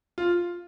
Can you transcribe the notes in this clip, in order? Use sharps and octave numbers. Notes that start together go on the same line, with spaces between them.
F4